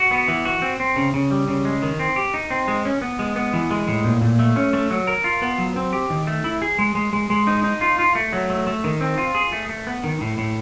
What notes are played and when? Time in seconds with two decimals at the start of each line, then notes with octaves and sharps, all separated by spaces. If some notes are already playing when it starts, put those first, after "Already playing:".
Already playing: F#4
0.11 B3
0.28 E3
0.45 F#4
0.62 C4
0.80 C4
0.96 C#3
1.14 C#3
1.31 G3
1.48 C#3
1.65 G#3
1.82 D#3
1.99 C4
2.16 G4
2.34 D#4
2.50 C4
2.68 G#3
2.85 C#4
3.02 B3
3.19 G#3
3.36 B3
3.53 E3
3.71 G#3
3.88 A2
4.04 A#2
4.22 A#2
4.39 A3
4.56 C#4
4.73 A3
4.90 F#3
5.07 A#4
5.24 F4
5.42 B3
5.58 F#3
5.76 C4
5.93 G4
6.10 D#3
6.27 A3
6.44 E4
6.62 G#4
6.79 G#3
6.95 G#3
7.13 G#3
7.30 G#3
7.47 D#4
7.64 D#4
7.81 F4
7.99 F4
8.15 A3
8.33 F#3
8.50 A3
8.67 A3
8.84 D#3
9.01 C4
9.18 F4
9.35 G#4
9.52 A3
9.69 A3
9.87 B3
10.04 D#3
10.21 A2
10.38 A2